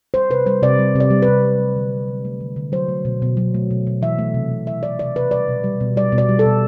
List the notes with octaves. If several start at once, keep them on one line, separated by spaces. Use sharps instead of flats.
G3 C5
C3 B4
G3 C5
C3 D5
G3
C3 D5
G3
B4
C3
F#3
A3
D3
D3
F#3
A3
D3
D3
F#3 C5
A3
B2
B2
F#3
A3
B2
B2
E3 E5
A3
C3
C3
E3 E5
A3 D5
C3 D5
C3 B4
G3 D5
B2
G3
B2
G3 D5
B2
D5
G3
A4
B2